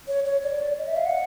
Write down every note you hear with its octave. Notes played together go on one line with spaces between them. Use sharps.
C#5
C#5
D5
D#5
E5
F5
F#5